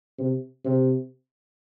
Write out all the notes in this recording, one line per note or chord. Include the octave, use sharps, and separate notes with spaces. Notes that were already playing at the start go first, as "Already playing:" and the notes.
C3
C3